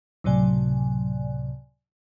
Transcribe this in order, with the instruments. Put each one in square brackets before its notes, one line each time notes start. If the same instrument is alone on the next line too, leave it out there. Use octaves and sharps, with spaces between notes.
[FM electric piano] C#2 A2 C3 F#3 D5 G#5